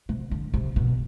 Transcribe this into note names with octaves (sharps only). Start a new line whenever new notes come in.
C3
D3
C3
B2